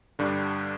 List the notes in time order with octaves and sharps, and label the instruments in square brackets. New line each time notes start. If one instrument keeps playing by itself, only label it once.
[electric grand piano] G2 D3 G3 D4